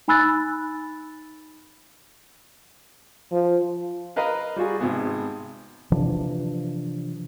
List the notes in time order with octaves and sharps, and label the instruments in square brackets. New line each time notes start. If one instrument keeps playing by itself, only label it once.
[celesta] D#4 G#5 B5 E6 F#6 A6
[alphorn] F3
[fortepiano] A#4 B4 D#5 F5 A#5 B5
G3 F4 F#4 G#4
G#1 C3 B3 G#4
[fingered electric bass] C3 E3 F3 D4